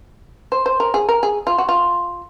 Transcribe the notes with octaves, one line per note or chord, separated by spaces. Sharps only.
C5
C5
A#4
G#4
A#4
G#4
F4
F#4
F4